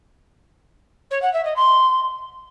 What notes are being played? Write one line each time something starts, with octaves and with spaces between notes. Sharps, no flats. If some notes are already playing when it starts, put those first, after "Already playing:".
C#5
F#5
E5
D#5
C6